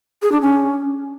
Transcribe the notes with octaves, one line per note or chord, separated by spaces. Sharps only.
G#4
D4
C#4